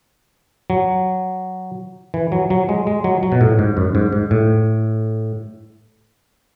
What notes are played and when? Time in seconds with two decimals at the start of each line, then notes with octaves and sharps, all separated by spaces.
0.70 F#3
2.14 E3
2.32 F#3
2.50 F#3
2.69 G#3
2.87 G#3
3.04 F#3
3.23 F#3
3.32 B2
3.41 A2
3.59 G#2
3.77 F#2
3.95 G#2
4.12 G#2
4.31 A2